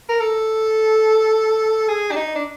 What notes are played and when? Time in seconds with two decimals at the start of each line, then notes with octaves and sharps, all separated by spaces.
0.09 A#4
0.20 A4
1.88 G#4
2.11 D4
2.16 D#4
2.35 D4